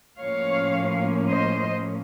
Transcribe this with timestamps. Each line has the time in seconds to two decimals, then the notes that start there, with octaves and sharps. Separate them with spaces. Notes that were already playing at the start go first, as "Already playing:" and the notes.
0.19 A2 F3 A#3 C#4 C#5 F5
1.29 C5 D#5